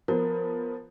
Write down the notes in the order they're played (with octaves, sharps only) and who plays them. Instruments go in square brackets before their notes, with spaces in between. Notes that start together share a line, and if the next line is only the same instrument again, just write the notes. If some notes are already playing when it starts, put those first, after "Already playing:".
[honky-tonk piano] F3 B3 [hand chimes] A#4